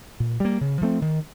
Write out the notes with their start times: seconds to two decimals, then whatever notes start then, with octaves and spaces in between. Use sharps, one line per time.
0.20 A#2
0.40 G3 A#3
0.61 C#3
0.81 F3 A3 C4
1.02 D#3